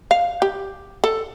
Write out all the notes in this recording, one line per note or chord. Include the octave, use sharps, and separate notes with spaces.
F5
G4
A4